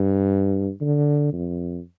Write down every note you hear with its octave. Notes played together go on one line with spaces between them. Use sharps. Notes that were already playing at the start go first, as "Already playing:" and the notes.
Already playing: G2
D3
F2